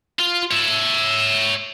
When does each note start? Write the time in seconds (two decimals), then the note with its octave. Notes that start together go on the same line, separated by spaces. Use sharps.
0.19 F4
0.51 C#5 E5